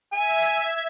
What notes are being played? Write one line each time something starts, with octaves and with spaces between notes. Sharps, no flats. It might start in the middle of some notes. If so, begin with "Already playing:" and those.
E5 G#5 G#6